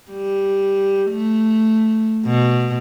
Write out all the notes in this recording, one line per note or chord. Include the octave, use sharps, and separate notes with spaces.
G3
A3
B2